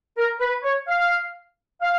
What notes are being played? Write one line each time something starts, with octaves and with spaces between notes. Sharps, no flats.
A#4
B4
C#5
F5
F5